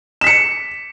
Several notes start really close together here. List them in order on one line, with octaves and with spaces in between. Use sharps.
E7 B6 C#7